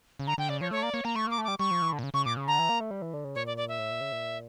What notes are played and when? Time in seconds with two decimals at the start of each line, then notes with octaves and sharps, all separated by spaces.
0.19 C#3
0.27 D3 A#5
0.38 D3 G5
0.49 C#3 D5
0.61 F3 C#5
0.71 A3 C#5
0.83 A#3 D5
0.94 A#3 C#5
1.05 A#3 A#5
1.15 A3 C#6
1.27 A#3 D6
1.38 A3
1.44 G3 D6
1.59 G3 C#6
1.71 F3
1.82 E3
1.93 D3
1.99 A#2
2.03 C#3
2.14 C#3 C#6
2.25 A#2 D6
2.37 C#3
2.48 D3 A#5
2.59 E3
2.69 A#3
2.80 A3
2.91 G3
3.02 E3
3.13 D3
3.24 C#3
3.35 A#2 C#5
3.47 D5
3.57 D5
3.69 E5
3.79 A2
3.91 A#2
4.01 C#3
4.12 A#2